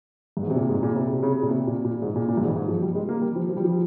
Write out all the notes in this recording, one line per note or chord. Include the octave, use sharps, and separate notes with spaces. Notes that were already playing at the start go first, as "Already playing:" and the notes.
G2
G#2
C3
A#2
G#2
A#2
C#3
C3
C3
C#3
A#2
C3
A#2
A#2
G#2
A#2
A#2
G2
G#2
G#2
F3
G3
G#3
A#3
G3
F3
F3
G3
F3